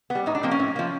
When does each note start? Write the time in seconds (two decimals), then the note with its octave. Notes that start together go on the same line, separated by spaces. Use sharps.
0.10 B3
0.15 G3
0.26 A2 D#4
0.35 D4
0.43 F3 A#3 C4
0.51 C#4
0.59 A2
0.76 F3 A#3